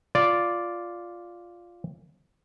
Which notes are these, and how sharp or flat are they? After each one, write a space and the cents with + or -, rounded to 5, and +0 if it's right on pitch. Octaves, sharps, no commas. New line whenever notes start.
F4 +0 D5 -5